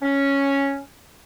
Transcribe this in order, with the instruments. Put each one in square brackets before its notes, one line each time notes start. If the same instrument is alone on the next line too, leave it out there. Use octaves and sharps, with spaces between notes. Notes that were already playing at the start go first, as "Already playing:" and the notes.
[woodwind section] C#4